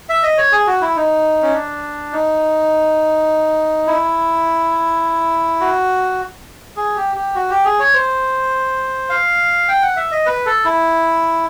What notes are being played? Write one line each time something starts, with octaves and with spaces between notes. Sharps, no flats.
E5
D#5
C#5
G#4
F#4
E4
D#4
C#4
D4
D#4
E4
F#4
G#4
G4
G4
F#4
G4
G#4
C#5
C5
F5
G5
F#5
E5
D#5
B4
A4
E4